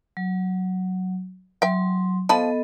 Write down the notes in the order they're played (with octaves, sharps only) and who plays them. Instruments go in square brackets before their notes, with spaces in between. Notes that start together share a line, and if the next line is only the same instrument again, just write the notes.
[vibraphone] F#3
[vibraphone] F#3 C6 [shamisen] E5 G5
[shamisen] F3 A5 B5 [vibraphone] B3 A4 D#5